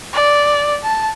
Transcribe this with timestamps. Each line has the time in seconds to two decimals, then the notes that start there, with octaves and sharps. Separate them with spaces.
0.13 D5
0.83 A5